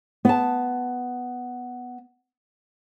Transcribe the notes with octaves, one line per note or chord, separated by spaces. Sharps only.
B3 A5